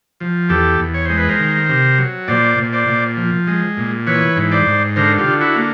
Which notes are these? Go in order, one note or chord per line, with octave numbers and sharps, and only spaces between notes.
F3
E2 G4 A4
E2
C#5
G#3 C5
B4
A#4 C5
D#3
C3
F#3
A#2 C5 D5
A#2
C5 D5
A#2
F3
G#3
A#2
E3 B4 C#5
G#2
C5 D5
G#2
D3 A#4 C5
F4 G4
D3
E4 F#4
A#3